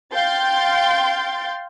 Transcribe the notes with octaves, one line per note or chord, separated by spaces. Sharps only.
F5 G5 C6 G6 A6